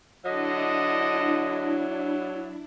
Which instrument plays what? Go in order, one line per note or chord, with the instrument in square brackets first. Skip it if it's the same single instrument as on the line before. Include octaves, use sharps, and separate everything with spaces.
[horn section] D3 D#5 [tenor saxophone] F#3 [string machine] D4 E4